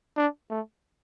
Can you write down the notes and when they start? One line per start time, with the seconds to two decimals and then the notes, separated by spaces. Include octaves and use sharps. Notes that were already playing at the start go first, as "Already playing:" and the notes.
0.17 D4
0.50 A3